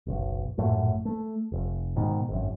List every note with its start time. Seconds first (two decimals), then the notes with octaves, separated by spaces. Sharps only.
0.07 F#1 B1
0.57 A#1 F#2 A2
1.05 A3
1.52 F1
1.96 G#2 B2 D#3
2.29 G#1 F#2